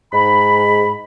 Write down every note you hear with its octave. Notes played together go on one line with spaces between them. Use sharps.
G#2 B5